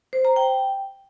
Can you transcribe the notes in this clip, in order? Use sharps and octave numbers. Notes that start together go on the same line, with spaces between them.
C5
A#5
G5